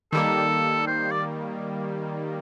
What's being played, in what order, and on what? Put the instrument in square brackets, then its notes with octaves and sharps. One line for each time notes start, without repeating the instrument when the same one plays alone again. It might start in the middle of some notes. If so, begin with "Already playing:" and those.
[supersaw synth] D#3 G3 A#3 [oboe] A4
[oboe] C5
D5